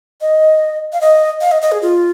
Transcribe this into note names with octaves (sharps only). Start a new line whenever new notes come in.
D#5
F5
D#5
F5
D#5
D#5
G#4
F4